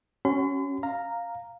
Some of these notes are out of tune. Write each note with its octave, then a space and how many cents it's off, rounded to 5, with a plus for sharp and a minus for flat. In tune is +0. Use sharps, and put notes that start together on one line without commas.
C#4 +0 F#4 +30 C6 -45
F5 +0 A#5 -5